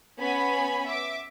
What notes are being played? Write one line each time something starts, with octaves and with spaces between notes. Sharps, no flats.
B3 C#4 G#5 B5
E5 D6